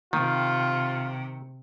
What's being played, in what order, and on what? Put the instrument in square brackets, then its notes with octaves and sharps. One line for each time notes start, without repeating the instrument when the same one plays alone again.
[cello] C3 [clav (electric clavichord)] D#3 [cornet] F4